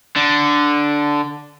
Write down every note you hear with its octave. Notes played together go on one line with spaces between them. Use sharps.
D3